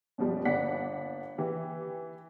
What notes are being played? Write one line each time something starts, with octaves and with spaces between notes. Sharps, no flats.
F#2 B2 F3 G3
G1 A#3 B3 D5 F#5 B6
E3 G4